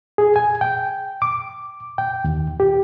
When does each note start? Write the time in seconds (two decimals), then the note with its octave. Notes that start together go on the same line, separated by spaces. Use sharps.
0.18 G#4
0.36 G#5
0.61 G5
1.22 D6
1.98 G5
2.24 D#2
2.60 G4